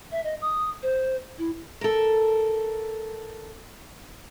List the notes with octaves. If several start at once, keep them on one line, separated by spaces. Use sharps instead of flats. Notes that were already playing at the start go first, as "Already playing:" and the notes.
E5
D#5
D#6
C5
E4
A4 A#4